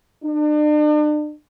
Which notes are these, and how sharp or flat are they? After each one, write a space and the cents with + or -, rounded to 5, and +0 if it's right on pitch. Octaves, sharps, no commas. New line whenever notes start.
D4 +40